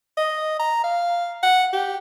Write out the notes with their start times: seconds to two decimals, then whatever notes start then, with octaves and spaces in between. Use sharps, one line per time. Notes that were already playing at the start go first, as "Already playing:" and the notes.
0.17 D#5
0.59 A#5
0.84 F5
1.43 F#5
1.73 G4